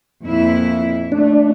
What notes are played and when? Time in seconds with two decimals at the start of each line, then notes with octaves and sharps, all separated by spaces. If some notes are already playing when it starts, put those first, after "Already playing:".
0.24 F2 A#2 E4
1.12 A3 D4